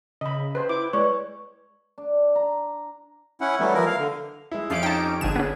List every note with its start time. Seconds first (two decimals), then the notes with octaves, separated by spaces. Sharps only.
0.21 C#3 D#5 B5
0.55 B4 C5
0.69 E4 D6
0.93 G#3 B4 C#5 D5 C#6
1.98 D4
2.35 A#5
3.41 C#4 E4 F#5
3.59 E3 F#3 G3 A3 B3
3.74 E3 F3 E4 A#4
3.86 F5
3.98 D3
4.51 G#3 E4
4.70 F2 C#4 G4 F5 D7
4.83 D#4 G5 A5
5.21 G#1 D3 D4 G#4 E7
5.36 B3 C#4